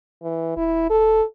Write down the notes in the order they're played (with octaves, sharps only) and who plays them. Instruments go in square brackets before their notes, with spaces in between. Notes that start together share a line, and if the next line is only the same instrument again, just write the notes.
[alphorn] E3
[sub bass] D#1 [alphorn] E4
[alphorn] A4